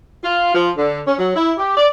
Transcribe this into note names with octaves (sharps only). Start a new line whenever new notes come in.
F4
F3
D3
C#4
F#3
E4
G4
D5